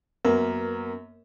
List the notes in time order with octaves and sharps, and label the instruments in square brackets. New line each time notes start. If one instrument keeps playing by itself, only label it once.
[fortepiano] F#2 A#3 [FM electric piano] B3 A#4